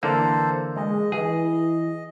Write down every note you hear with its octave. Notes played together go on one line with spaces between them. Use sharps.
D3 E3 A#3 A4 C5
G#3 D#5
E3 G#4